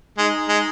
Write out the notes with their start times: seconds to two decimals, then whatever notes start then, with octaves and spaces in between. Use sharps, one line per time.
0.18 G#3 D#4
0.49 G#3